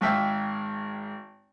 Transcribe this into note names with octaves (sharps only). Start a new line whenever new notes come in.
G#1 G#2 E5 F5 G5